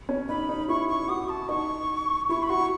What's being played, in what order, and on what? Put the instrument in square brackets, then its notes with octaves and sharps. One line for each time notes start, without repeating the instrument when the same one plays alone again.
[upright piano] C#4
[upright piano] D#4 [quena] B5
[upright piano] D#4
[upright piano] E4 [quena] C#6
[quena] C#6
[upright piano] F#4 [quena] D#6
[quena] A5
[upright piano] D#4 [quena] C#6
[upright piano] E4 [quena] C#6
[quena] B5
[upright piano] F#4 [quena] C#6